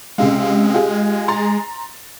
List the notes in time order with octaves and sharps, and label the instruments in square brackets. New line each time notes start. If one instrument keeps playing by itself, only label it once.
[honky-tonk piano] C#2 C3 F5 [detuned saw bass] G#3
[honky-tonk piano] F4 G4 G#4
A#5 C6 A6